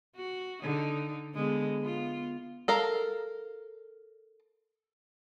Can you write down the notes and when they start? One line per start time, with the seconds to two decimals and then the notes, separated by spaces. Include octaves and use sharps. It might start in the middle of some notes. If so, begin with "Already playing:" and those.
0.16 F#4
0.62 D3 D#4
1.34 D3 G#3 B3
1.81 B3 F4
2.68 A4 A#4 F5